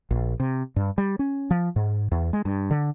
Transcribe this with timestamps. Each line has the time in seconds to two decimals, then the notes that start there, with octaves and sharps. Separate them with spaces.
0.11 A#1
0.40 C3
0.76 G2
0.98 G3
1.19 C#4
1.51 F3
1.76 G#2
2.12 E2
2.33 G#3
2.45 G2
2.71 D3